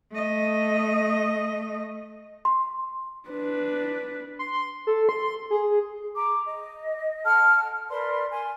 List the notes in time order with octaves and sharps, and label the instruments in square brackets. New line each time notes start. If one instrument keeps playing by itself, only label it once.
[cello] A3 D#5
[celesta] C6
[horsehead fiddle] D4 B4
[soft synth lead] C6
A4
C6
G#4
[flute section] A#5 D6
D#5
A4 F#5 A5 F6
A#4 B4 D5 C6
A#4 G#5 C6